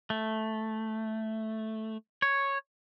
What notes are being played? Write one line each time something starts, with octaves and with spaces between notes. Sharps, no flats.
A3
C#5